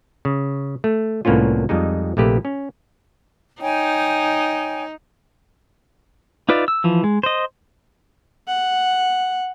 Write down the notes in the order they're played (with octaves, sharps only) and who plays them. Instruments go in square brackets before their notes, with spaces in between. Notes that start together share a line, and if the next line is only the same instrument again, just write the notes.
[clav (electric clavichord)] C#3
A3
C2 A2 A#3 B3 C#4 F4
F2 G3 G#3 D#4
A#1 C3 A3 A#3 G4 B4
C#4
[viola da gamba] D#4 [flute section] C#5 G5 G#5
[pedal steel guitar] D#4 F4 B4 D5 E5
E6
E3 F3
G#3
C5 D#5
[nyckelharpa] F#5